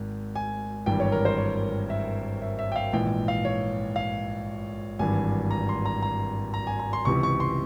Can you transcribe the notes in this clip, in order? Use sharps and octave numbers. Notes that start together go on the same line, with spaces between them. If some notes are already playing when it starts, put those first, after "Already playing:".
Already playing: G#1 G#2
G#5
G#1 G2 E3 G5
C#5
A#4
C5
C#5
E5
E5
E5
G5
F5
A#1 G#2 E3 G5
F5
C#5
F5
G#1 G2 E3 G#5
A#5
C6
A#5
A#5
A#5
G#5
A#5
C6
C#2 C3 E3 C#6
C#6
C6